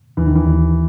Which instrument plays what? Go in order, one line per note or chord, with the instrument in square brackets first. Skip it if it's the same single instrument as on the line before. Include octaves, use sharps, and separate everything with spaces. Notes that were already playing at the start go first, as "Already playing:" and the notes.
[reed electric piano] D#2 [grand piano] E3
[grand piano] D#3
E3
[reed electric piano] D#2